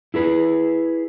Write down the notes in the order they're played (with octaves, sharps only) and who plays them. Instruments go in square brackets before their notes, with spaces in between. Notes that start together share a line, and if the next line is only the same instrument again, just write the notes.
[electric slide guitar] E4 G#4 B4